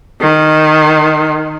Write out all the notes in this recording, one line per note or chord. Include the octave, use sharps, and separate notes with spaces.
D#3